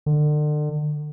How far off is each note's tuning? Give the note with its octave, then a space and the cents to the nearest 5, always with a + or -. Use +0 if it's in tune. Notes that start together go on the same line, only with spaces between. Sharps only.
D3 +35